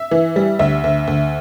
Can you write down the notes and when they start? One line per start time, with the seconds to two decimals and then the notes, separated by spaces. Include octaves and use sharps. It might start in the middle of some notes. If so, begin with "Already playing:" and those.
Already playing: E5
0.11 E3
0.36 G3
0.59 D2 E5
0.84 D2
1.07 D2